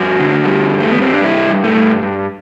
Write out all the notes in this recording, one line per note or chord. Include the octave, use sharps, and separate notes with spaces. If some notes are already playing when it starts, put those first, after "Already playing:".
Already playing: G2 F#4
D3
G3
G2
A3
B3
G3 C4
D4
G2 E4
G2
A3
G2
G2